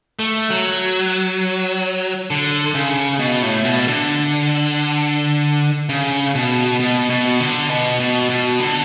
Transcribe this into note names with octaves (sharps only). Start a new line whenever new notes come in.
A3
F#3
D3
C#3
B2
A2
B2
D3
C#3
B2
B2
B2
D3
B2
B2
B2
D3